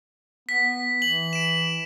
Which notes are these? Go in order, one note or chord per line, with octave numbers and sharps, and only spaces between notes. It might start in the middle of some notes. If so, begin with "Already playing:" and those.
B3 B6
E3 F#7
D7 E7